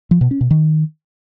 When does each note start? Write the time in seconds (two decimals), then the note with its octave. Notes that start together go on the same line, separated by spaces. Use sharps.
0.11 F3
0.21 B2
0.31 C#4
0.41 B2
0.51 D#3